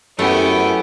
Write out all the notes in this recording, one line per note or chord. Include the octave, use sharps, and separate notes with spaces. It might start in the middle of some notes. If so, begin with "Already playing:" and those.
F#2 A3 B3 E4 G4 F#5 G#5